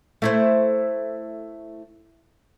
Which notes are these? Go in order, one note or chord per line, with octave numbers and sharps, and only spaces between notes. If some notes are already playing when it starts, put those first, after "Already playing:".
A3 E4 C5